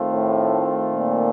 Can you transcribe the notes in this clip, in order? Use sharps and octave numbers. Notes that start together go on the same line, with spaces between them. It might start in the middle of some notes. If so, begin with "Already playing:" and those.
Already playing: D#3 A3 C4 F4
A2
A#2